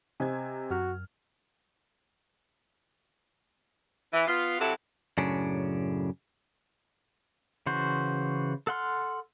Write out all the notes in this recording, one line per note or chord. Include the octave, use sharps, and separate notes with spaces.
C3 C5 D#5 G#5 G#6
F#2 F#4 F6
E3
B3 F4
C3 F#3 E4 F#4 A4
F#2 A2 C#3 C#4 D4
C#3 E3 F#4 C5
A4 F#5 C6 F6